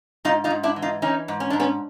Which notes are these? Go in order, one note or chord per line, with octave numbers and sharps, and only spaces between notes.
G#2 D#4 F4
D#4 F4
G#2
D4 E4
E3
D#4 F4
E3 C#4 D#4
G#2
C#4
G#2 D4
B3 C#4